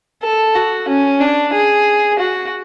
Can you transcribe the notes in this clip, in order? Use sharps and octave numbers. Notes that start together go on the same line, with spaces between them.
A4
F#4
C#4
D4
G#4
F#4